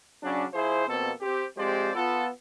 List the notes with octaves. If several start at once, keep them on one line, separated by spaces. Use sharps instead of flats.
C#3 F#3 C#4 D4
F3 E4 G#4 C5
F2 B2 A#3 C4 A4
C4 G4
F3 G#3 C4 G4 C5 D5
B3 F4 A4